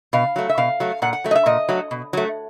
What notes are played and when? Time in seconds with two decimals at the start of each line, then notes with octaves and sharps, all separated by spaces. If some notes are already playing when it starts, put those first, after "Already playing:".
0.13 B2 F5
0.36 F#3 A3
0.49 E5
0.58 B2 F5
0.80 F#3 A3
1.02 A#2 F#5
1.13 F#5
1.24 F#3 A3
1.31 D#5
1.36 E5
1.46 A#2 D#5
1.69 F#3 A3
1.91 B2
2.13 F#3 A3